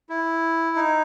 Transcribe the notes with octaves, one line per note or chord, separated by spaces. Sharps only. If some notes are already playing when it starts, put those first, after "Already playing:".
E4
D#4